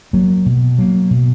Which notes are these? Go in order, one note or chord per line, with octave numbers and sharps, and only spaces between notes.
F#3 A#3
B2
F#3 A#3
B2